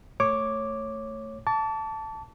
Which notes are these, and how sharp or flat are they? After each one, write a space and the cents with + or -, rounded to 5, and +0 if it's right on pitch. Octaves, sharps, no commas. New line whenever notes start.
A3 +10 C#5 -10 D6 +0
A5 +0 D6 -40